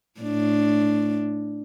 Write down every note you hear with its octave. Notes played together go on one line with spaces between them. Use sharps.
A2 D4